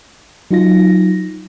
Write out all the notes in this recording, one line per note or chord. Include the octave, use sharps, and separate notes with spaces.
F#3 D#4 F4 A#6